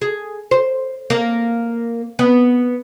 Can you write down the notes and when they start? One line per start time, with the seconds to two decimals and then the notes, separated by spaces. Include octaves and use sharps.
0.01 G#4
0.51 C5
1.10 A#3
2.19 B3